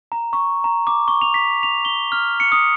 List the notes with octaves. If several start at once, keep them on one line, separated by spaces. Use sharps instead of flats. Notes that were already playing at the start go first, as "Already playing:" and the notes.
A#5
C#6
A#5
D6
C#6
F7
B6
F7
G7
F6
C#7
D#6